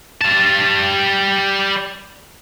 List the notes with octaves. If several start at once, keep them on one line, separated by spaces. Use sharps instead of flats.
G3 A5